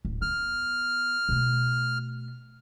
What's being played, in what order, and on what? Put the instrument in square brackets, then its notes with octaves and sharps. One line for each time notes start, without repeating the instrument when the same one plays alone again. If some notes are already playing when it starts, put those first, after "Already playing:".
[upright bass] D1
[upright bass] B3 [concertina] F6
[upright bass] B2 A3